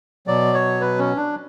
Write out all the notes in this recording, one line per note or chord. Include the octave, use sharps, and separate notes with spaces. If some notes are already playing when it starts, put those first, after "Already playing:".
B2 F#3 D5
C#5
B4
C#4
D4